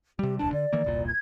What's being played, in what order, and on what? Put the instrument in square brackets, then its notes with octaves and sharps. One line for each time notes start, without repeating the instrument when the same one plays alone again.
[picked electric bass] C3 G3 [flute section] G4
[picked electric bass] D#1 C2 D4 [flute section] A5
[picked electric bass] D3 [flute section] D5
[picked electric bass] D#3 E3 A#3
E1 C2 A#2
[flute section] G#6